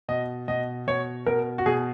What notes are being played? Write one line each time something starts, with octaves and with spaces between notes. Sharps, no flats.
B2 D#5
B2 D#5
B2 C#5
B2 A#4
F#4
B2 G#4